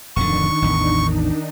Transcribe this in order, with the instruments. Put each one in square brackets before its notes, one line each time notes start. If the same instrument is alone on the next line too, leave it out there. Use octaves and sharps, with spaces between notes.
[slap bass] D1 F2 D3 [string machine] D#3 D4 D#4 [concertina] C#6
[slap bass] A1 E2